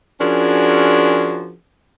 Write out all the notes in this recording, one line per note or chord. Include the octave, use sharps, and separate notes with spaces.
F3 C#4 D4 F#4 G#4 A#4